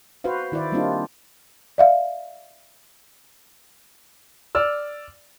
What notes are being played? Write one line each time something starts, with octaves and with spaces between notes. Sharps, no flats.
F#4 B4 C5 F5
D#3 E4 C5 D5
G3 A#3 C4 D4 D#4 F4
D5 E5 F5
D5 E6 F6